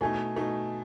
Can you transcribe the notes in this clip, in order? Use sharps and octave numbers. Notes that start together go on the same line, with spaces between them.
B2 A3 D#4 G#5
B2 A3 D#4